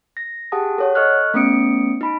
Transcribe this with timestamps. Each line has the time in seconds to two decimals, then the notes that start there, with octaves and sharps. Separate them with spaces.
0.17 A#6
0.52 G4 G#4 F#5 A5 D#6
0.78 A4 C#5 F#5
0.95 A4 D#5 C#6 F6 F#6
1.34 A3 B3 C#4 D#6 C#7 D7
2.01 D#4 B5 D7